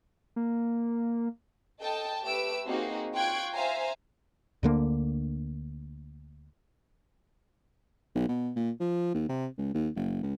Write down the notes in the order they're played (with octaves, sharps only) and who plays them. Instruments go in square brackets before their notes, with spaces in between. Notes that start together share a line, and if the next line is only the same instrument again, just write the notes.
[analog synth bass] A#3
[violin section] A4 D#5 G5 A5
A3 G4 B4 E6 D7
A#3 C4 D#4 F#4 G#4
F4 G5 C#6 F#6 G#6 D7
C5 E5 F5 G#5 A#5
[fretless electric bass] D2 D3 A#3
[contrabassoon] B1
B2
A#2
F3
D#2
C3
C#2
D#2
F#1
C#2